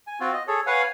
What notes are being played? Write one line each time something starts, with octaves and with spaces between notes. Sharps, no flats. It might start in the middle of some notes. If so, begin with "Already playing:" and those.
G#5
C4 F4 F#4
D#5
G#4 A4 C#5
B4 C#5 F5 F#5 G#5